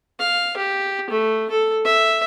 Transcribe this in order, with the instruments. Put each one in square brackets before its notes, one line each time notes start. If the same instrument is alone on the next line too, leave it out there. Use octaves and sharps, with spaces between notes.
[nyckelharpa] F5
G4
A3
A4
E5